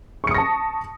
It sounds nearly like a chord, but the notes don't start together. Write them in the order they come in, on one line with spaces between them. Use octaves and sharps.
C#6 C#7 D#6 A#6 A5